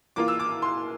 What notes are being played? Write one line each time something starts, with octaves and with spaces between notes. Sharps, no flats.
E3 A#3 F4 D6
E6
D6
C6